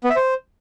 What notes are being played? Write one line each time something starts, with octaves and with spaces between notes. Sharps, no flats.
B3
E5
C5